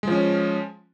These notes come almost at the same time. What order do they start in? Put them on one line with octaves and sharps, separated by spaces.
G#3 F3 C#4